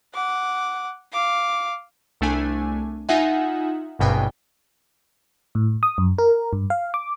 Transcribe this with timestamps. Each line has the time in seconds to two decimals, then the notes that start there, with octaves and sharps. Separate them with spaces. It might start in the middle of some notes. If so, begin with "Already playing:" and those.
0.14 F#5 D6
1.12 F5 D6
2.21 C2 A3 D4 G#5
3.09 D#4 F4 E5 F#5 G#5
3.99 G#1 C#2 G2 B2 G5 G#5
5.55 A2
5.83 D#6
5.98 F#2
6.19 A#4
6.53 G2
6.70 F5
6.94 D6